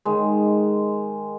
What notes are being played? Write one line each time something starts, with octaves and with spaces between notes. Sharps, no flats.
D#3 G#3